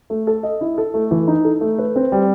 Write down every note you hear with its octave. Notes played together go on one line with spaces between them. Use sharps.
A3
A4
D#5
E4
A4
A3
E3
D#4
A4
A3
B4
C4
G3